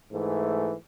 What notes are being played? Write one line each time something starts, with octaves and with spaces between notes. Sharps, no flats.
G#2 E3 A3